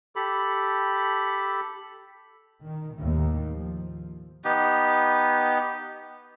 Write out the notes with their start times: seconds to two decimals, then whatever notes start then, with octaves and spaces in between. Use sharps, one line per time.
0.16 G4 A4 B5
2.64 D#3
2.95 D#2 A2
3.50 F3
4.45 B3 D#4 G4